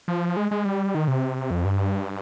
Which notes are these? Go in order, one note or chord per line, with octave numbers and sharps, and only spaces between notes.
F3
G#3
G#3
G3
D#3
C3
F2
G2